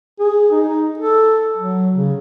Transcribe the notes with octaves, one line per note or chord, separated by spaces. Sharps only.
G#4
D#4
A4
F#3
C#3